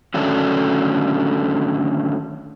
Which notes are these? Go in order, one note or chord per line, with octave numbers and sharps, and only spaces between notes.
D3 D#3 F#3 A3 C#4 D4